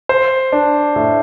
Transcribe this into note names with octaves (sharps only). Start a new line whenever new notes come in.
C5
D4
A2